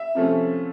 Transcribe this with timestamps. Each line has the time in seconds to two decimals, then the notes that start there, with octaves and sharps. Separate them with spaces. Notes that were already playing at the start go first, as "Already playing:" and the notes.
Already playing: E5
0.15 C3 F3 A3 C#4